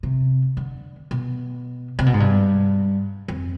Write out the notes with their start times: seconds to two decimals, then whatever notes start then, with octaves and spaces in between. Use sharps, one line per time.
0.03 C3
0.57 D3
1.11 B2
1.99 C3
2.06 B2
2.14 G#2
2.20 G2
3.28 F2